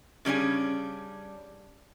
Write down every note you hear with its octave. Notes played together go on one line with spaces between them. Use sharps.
C#3 G3 C#4 D4 G#4